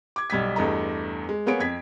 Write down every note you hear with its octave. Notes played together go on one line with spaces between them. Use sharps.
D6 G#6
B1 G3 G#6 B6
E2 G2 A3 D#5 A#5
G#3
A#3 B3 G#4 C#5 D7
F2 G#6 B6